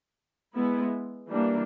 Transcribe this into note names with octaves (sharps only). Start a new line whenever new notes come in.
G#3 B3 E4
E3 G3 A#3 D4